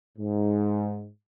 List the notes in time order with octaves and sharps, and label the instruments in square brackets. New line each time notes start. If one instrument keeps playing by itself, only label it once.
[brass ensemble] G#2